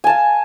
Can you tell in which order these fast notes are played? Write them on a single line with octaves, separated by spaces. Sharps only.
G#5 A5 F5